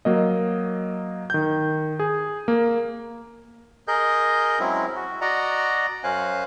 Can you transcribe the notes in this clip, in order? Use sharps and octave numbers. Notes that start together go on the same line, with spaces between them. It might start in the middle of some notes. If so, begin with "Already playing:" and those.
F#3 A#3 D#5
D#3 G6
G#4
A#3
G#4 A#4 D#5 G6
F#3 G#3 C4 C#4 E4
F#4
F#4 D5 D#5 F#5 A#5
F#2 C#4 C5 F5 G#5 F#6